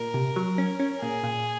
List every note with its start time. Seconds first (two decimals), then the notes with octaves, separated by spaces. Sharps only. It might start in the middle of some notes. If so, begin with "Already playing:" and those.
Already playing: A#2 A#4
0.14 C3
0.36 F#3
0.58 C#4
0.79 C#4
1.01 A#2 G#4
1.23 A#2